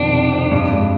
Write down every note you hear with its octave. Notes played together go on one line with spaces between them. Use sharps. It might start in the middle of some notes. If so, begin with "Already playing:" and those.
Already playing: F2 B2 D#3 D4
C3
F2
G2
G#3